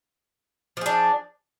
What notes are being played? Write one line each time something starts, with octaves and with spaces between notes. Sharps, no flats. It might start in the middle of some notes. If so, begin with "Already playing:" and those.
F3 D4 G#4